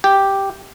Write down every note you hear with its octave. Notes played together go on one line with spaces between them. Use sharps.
G4